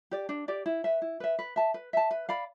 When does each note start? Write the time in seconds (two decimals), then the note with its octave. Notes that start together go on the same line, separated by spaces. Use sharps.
0.11 G4 D5
0.29 D4
0.48 G4 D5
0.66 E4
0.84 B4 E5
1.02 E4
1.20 B4 E5
1.39 B4
1.56 E5 A5
1.74 B4
1.93 E5 A5
2.11 B4
2.29 D5 F5 B5